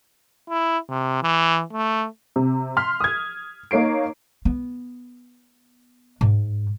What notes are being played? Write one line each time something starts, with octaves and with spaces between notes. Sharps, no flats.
E4
C3
E3
A3
C3
C6 F6 B6
D#6 G#6
A#3 D#4 C#5 C7 D7
B3
G#2